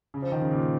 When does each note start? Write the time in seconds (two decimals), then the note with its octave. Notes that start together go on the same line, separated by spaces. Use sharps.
0.14 C#3
0.22 F3
0.32 D#3
0.41 C#3
0.51 A#2